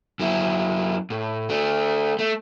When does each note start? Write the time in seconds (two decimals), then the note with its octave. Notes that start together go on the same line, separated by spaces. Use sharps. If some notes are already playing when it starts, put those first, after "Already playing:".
0.19 F#2 E4
1.10 A2
1.50 A3 D4
2.19 A3